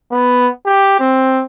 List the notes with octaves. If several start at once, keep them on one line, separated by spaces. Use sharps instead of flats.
B3
G4
C4